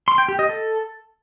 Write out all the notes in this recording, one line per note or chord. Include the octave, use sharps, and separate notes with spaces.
C6
G5
G4
D#5
A4